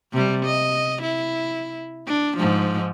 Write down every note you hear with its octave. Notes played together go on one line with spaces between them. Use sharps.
C3 G3
D#5
E4
D4
G#2 F3